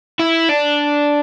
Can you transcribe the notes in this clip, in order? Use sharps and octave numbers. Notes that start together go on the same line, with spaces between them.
E4
D4